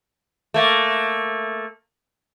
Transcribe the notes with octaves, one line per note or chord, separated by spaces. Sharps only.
A3 A#3